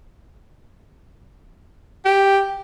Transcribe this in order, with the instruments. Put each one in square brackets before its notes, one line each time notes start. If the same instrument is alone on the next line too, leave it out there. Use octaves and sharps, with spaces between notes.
[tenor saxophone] G4